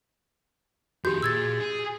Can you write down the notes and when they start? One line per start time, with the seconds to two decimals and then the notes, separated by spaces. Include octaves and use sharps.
1.05 F2 D#3 G#3 F#4 G4 G6
1.23 A#2 E6 G#6 A6
1.60 G#4